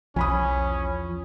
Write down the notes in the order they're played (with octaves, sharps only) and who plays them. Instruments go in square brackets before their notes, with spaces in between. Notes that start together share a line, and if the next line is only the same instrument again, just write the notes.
[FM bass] B1 [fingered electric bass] E2 F3 [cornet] C#4 [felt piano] G#5 B5 D#6